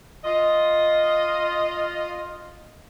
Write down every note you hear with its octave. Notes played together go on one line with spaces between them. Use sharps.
F4 D#5